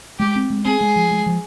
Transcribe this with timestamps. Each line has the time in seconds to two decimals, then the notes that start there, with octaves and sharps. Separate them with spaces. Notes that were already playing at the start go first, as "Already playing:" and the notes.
0.19 G#3 G4
0.36 C4
0.50 G#3
0.65 C4 G#4
0.81 G#3
0.96 F3
1.11 G#3
1.26 F3